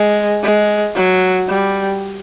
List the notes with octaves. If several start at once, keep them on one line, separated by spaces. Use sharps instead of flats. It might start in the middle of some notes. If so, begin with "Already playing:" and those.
Already playing: G#3
G#3
F#3
G3